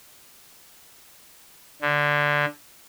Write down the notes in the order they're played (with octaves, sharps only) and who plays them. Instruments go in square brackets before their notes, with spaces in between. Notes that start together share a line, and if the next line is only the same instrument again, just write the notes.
[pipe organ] D3